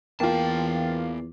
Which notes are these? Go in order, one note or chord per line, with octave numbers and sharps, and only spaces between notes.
E2 E3 A#3 D4 F4 G5 A5